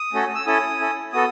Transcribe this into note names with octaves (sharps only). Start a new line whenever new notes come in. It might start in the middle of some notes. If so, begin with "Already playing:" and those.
Already playing: D#6
A3 C#4 F#4 A4
E6
C#4 E4 A4 D#6
C#4 E4 A4
B3 F#4 A4 D#6